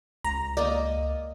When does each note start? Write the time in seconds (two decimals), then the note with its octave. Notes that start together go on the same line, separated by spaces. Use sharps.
0.24 C#2 A#5
0.57 A#3 D5 D#5